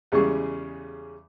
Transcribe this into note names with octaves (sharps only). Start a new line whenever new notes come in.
E2 C#3 G3 G#3 G#4 C#6